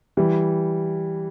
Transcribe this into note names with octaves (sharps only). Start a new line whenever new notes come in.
E3 G3